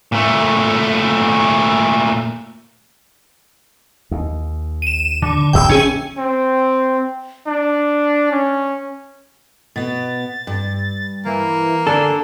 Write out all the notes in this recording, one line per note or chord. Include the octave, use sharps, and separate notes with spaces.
A#2 A3
D#2
D#7 E7
D3
D1 G1 G5 E6
A#1 C#4 G#4
C4
D4
C#4
B2 B3 A6
G2
E3 A#3
D3 D4 A4 G#5